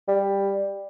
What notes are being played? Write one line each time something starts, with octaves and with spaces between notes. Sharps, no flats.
G3